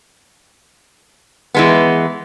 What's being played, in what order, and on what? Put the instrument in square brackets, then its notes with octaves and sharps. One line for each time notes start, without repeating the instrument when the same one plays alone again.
[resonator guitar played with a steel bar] E3 G#3 B3